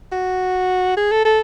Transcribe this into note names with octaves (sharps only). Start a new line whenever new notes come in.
F#4
G#4
A4
A4